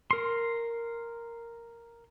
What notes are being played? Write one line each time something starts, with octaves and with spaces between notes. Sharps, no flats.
A#4 C6